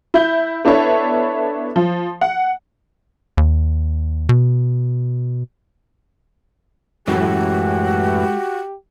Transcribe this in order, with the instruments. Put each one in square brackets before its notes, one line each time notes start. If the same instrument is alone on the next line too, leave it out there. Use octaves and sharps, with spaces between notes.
[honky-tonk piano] E4 E5 G6
B3 D4 E4 A4 C#5 E5
F3
F#5
[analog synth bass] D#2
B2
[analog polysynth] F#2 A2 E3 [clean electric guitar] G#3 A4 F5 [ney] F#4 [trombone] G4